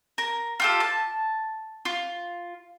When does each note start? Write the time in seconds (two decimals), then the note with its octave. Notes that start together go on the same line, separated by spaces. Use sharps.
0.18 A#4
0.60 F4 G4 A4
0.80 A5
1.85 F4